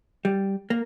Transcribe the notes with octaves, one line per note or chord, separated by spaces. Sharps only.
G3
A#3